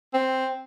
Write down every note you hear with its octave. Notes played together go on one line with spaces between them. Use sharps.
C4